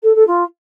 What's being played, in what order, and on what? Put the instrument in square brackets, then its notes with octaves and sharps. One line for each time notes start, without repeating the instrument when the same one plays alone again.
[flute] A4
A4
F4